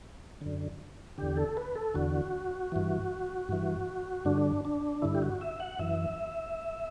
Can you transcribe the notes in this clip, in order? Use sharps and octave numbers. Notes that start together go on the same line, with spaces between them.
F#2 D3
E2 D3 G4
A4
B4
A4
E2 D3 F#4
G2 E3
G2 E3
G2 D3 D4
D4
G2 D3 E4
G4
F#4
E5
F#5
F#2 E3 E5